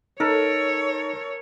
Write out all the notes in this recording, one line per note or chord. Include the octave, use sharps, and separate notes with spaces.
D#4 A4 A#4 C#5